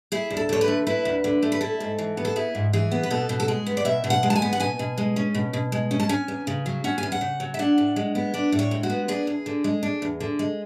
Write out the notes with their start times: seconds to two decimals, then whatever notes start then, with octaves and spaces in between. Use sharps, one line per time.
0.12 E4 G#4
0.30 D2
0.37 A4
0.49 D3 C#5
0.61 B4
0.68 A3
0.87 E4 B4
1.05 D2
1.24 D3
1.42 A3
1.52 B4
1.61 E4 A4
1.80 G#2
1.98 E3
2.17 B3
2.25 A4
2.36 E4 G#4
2.55 G#2
2.73 E3 G#4
2.91 B3
3.03 B4
3.10 B2 A4
3.29 B2
3.40 A4
3.48 G#3 G#4
3.66 B3
3.77 D5
3.85 B2 E5
4.04 B2
4.10 F#5
4.23 G#3
4.30 A5
4.35 G#5
4.42 B3
4.53 F#5
4.60 B2 G#5
4.79 B2
4.98 G#3
5.16 C#4
5.35 B2
5.53 B2
5.72 G#3
5.91 C#4
6.00 A5
6.09 C#4 G#5
6.28 E2
6.47 C#3
6.66 F#3
6.84 C#4 F#5
6.98 G#5
7.03 E2
7.12 F#5
7.21 C#3
7.40 F#3
7.54 E5
7.59 D4 F#5
7.78 A2
7.96 G#3
8.15 B3
8.34 D4 D5
8.52 A2
8.59 C#5
8.71 G#3
8.83 F#4
8.90 B3
9.08 D4 G#4
9.27 E2
9.46 D3
9.64 G#3
9.83 D4
10.02 E2
10.20 D3
10.39 G#3